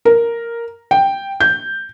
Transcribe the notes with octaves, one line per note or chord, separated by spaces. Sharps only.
A#4
G5
G6